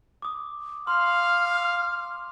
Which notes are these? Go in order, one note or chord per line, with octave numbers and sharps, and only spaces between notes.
D6 D#6
F5 C6 D6 F6